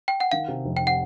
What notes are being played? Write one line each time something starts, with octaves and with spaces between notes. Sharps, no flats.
G5
F#5
D#3 F5
C3
F1
G5
F#5